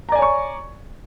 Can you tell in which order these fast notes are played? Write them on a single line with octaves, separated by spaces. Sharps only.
A#5 D5 G#5 C#5 C#6